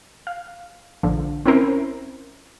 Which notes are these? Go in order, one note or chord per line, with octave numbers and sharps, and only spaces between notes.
F5
A#1 D3 F3
C4 C#4 E4 A#4 C5